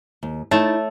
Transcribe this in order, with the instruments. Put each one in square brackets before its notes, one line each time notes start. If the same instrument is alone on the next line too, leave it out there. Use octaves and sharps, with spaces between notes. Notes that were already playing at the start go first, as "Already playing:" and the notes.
[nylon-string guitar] D#2
[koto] A3 [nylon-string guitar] D#4 E4 [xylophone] C#5 [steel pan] A5